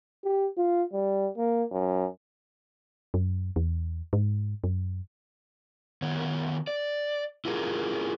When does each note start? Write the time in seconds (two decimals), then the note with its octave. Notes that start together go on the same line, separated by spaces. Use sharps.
0.24 G4
0.57 F4
0.93 G3
1.37 A#3
1.71 F#2
3.14 F#2
3.56 E2
4.13 G#2
4.64 F#2
6.02 D#3 B3 C#5
6.67 D5
7.45 E4 F4 G4 G#4 A#4